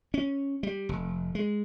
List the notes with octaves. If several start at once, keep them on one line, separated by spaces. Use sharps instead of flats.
C#4
G3
F1
G#3